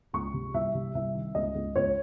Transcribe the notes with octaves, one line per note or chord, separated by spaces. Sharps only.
C#2 C#6
C3
C2 E5
C3
C2 E5
D#3
C#2 D#5
C#2
C#2 C#5